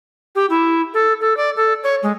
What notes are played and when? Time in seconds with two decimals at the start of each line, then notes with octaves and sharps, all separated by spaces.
0.35 G4
0.50 E4
0.94 A4
1.21 A4
1.37 D5
1.56 A4
1.83 C#5
2.03 G#3